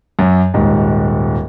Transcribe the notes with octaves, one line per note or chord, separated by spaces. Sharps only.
F#2
D#1 G#2